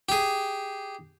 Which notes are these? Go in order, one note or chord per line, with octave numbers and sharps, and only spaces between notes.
G4 G#4